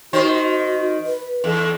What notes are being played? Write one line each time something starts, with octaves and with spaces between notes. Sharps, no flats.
D#3 F#4 C5
F#4
B4
E2 A4